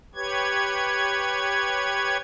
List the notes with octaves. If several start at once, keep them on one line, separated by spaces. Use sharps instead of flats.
G4 B4 C#5 G#6